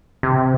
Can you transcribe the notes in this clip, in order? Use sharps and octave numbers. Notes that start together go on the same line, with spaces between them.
C3